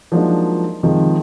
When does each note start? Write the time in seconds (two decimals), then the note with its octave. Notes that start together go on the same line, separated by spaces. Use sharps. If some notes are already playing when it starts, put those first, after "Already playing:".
0.12 F3 F#3 G#3 A#3 D4 D#4
0.83 C3 D#3 F3 G#3